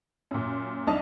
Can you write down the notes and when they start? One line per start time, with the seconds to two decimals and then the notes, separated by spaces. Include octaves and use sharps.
0.31 F#2 A#2
0.87 C2 D4 D#4 D#5 A5 F7